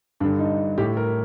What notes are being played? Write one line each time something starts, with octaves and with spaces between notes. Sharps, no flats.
G2 D3 D4
D#4
A2 G4
A#4